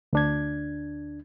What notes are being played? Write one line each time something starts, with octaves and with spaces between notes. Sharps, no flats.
D2 D4 G#6